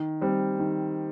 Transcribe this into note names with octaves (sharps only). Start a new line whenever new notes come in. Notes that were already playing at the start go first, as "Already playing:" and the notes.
Already playing: D#3
G3 C4
D#3